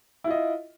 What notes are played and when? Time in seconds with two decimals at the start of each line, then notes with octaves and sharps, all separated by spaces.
0.24 E4
0.27 F4
0.31 D#5